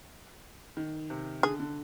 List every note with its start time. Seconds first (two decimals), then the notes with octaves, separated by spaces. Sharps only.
0.77 D#3
1.10 C3
1.43 D3 G#4
1.60 D3